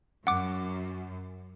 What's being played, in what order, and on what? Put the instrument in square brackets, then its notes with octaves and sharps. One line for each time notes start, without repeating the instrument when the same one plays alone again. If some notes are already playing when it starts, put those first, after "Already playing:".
[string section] F#2 [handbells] F#5 D6